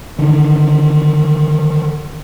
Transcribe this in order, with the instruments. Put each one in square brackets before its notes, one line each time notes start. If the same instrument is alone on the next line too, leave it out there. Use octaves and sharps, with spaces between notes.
[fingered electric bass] D3 D#3